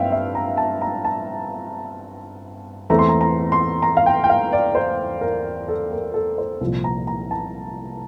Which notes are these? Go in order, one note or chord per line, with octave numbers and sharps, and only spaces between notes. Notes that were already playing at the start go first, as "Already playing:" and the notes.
Already playing: G2 C4 E5 F5 G5
E5
A#5
A5
A#5
A5
E2 E3 A3 C4 A#5
C6
A#5
A#5
C6
A#5
F5
G5
G5
F5
D5
C5
A#4
A4
A#4
A4
C5
C2 A#2 F3
A#5
A#5
A5